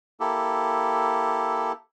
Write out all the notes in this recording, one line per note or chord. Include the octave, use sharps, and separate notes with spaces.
A#3 E4 G4 A4